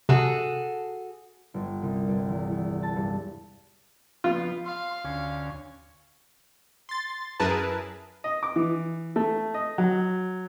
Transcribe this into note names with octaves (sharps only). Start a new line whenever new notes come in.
C3 F#4 G#4 A4
G1
C2
G1
E2
E2
A5
G2
F3 B3 F4
F5 C6
D2 C#4 G#5
C6 A6
F#2 E4 G#4 A#4 B4 A5
D#5
D6
E3
A3
D#5
F#3